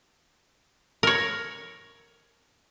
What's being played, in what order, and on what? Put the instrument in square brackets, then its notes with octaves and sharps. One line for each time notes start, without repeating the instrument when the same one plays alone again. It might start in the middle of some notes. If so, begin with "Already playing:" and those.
[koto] A#4 C#5